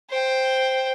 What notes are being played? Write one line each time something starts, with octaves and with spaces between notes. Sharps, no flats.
C5 G5